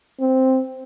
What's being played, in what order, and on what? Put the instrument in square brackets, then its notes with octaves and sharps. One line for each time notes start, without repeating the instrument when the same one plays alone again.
[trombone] C4